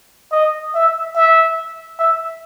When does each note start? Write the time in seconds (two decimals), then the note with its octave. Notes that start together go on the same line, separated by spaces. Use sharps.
0.32 D#5
0.74 E5
1.15 E5
1.99 E5